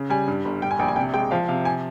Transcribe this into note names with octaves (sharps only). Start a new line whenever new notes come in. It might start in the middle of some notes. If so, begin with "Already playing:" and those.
Already playing: C#3
G3 G#5
G2
G1
G3 G5
G#5
A#1 G5
G#5
C3 G5
G#3 G5
F3 F5
C3 F5
G#5